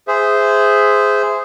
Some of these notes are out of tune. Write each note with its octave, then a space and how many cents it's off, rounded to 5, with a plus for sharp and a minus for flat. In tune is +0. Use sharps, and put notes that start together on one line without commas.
G#4 +0 C5 -15 E5 +5